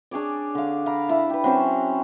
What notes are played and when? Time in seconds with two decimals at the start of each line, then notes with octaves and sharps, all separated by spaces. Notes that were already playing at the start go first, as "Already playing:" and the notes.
0.11 D4 G#4 C#5 D5
0.55 D3 F5
0.86 D5 F5 A#5 B5
1.08 E4 A5
1.30 G4 B4
1.44 F#3 C4 C#4 C5